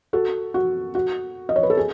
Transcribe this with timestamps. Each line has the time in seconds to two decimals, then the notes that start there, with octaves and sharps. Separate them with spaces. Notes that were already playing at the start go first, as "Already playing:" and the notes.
0.13 F#4 A4
0.54 F#4
0.95 F#4
1.49 D#5
1.56 C#5
1.63 B4
1.70 A4
1.77 G#4